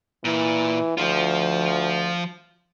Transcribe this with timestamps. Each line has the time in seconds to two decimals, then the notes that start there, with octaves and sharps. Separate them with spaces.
0.25 A#2 E3
0.98 D2 F3 F4